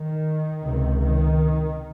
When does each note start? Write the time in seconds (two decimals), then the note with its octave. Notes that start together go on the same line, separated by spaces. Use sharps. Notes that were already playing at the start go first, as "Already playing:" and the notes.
Already playing: D#3
0.64 C#2 C3
0.99 D#3